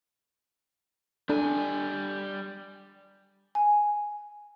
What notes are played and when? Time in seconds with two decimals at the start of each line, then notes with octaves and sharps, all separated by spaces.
1.29 G3 D4 A4 G#5
3.55 G#5